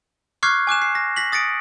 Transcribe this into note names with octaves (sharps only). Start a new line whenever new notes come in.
C#6 D6 F6 F#6 G#6 C7
G#5 D6 F#6 E7
C7
A#6
A#6 B6 F#7
D#6 A6 A#6 C#7 D7